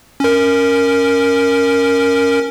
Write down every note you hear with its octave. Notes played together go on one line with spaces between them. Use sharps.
C#4 A#4